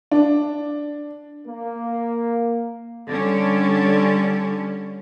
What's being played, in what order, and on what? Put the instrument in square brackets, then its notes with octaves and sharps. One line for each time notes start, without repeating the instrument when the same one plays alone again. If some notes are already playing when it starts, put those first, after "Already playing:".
[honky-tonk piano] D4
[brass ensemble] A#3
[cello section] D3 G3 C#4